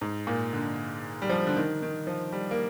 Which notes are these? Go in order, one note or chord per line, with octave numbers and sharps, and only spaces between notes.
G#2
A#2
D3
G3
F3
D3
D#3
D#3
F3
G3
A#3